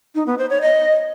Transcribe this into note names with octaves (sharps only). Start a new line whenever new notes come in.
D#4
B3
C5
C#5
D#5